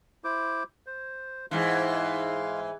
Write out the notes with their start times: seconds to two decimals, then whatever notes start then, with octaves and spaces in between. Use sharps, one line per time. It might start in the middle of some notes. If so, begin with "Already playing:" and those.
0.24 E4 C5 D6
0.86 C5
1.51 G#2 E3 F5 C6